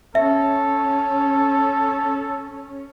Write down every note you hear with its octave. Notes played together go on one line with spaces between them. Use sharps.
C#4 A4 E5